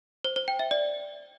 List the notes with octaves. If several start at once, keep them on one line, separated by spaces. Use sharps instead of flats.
C5
C5
G5
E5
D5